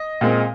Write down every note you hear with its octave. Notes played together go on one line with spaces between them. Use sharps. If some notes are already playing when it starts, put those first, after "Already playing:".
Already playing: D#5
A#2 G#3 C4